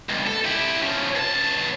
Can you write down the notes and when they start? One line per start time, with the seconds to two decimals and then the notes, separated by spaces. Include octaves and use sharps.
0.10 C#2 G2
0.27 A4
0.45 E4 G4
0.82 F3 C#4
1.15 C#2 A5